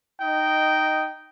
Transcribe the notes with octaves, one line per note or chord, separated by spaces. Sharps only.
D#4 D#5 G5